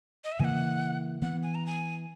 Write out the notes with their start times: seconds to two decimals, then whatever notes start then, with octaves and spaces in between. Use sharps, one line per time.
0.24 D#5
0.32 E5
0.39 C#3 E3 A#3 F#5 G#5
1.22 E3 B3 F#5
1.43 G#5
1.55 A#5
1.66 G#5